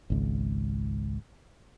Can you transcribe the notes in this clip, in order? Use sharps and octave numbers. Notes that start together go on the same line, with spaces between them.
G#1 C#2